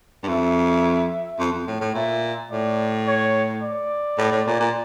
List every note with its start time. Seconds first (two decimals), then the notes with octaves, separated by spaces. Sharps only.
0.23 G2
0.28 F2 E5
1.39 F2
1.53 F2
1.67 A2
1.81 A2
1.95 A#2 E5
2.51 A2 D5
3.07 C#5
3.62 D5
4.18 A2
4.32 A2
4.47 A#2
4.60 A#2